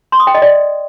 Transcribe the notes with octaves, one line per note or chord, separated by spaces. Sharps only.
C6
D#6
G5
D#5
D5